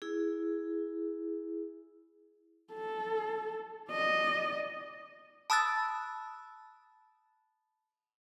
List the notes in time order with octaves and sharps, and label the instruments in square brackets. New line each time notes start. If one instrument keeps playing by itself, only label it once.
[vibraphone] E4 G#4
[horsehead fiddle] A4
D5 D#5
[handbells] A5 B5 D#6 E6 F#6 A6